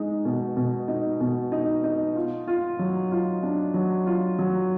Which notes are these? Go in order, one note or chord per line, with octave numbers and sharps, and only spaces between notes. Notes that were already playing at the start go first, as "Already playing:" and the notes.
Already playing: G#3 D#4
B2
B2
D#4
B2
D#4
D#4
F4
F4
F#3
F4
D4
F#3
F4
F#3